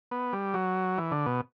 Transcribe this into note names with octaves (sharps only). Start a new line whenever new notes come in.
B3
G3
F#3
E3
D3
B2